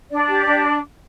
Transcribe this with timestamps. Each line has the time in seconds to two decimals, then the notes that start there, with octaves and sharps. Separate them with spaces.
0.10 D4 D5
0.28 G4
0.45 D4